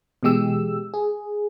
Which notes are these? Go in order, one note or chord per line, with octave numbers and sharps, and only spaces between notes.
B2 E3 G#3 G4 E6
G#4